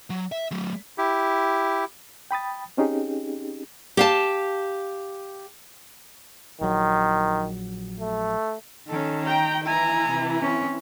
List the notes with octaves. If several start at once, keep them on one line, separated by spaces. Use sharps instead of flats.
F#3
E5
F#3 A3
E4 G4
G5 B5 D#6 A6
C4 C#4 D#4 G4 G#4
G4 F5 A5
A#1 D#3 F#3
A3
D#3 C#4 A4
G5 A#5
E3 E4 G#5 A#5
C3
C4 C#4